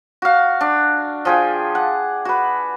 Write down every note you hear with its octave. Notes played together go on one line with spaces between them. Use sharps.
F#4 F5
D4
F3 G#4 G5
F#5
F#4 B4